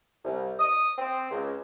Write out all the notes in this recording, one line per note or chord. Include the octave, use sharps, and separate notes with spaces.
C2
D#6
C4
C#2